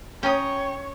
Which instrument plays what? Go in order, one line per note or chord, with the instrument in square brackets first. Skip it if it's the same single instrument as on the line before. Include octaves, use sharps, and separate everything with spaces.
[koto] C#4 [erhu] C#5 [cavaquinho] G5 A#5 D#6